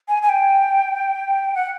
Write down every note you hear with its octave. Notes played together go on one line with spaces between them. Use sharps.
G#5
G#5
G5
F#5